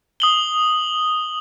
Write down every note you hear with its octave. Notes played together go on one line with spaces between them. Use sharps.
D#6 F#7 G7